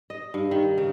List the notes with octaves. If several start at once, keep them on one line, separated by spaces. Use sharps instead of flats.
D#5
G2
D#3
C#3